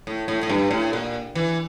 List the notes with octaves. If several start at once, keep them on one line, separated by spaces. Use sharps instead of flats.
A2
A2
A2
G2
A2
A#2
E3